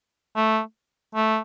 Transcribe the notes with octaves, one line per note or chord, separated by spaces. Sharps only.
A3
A3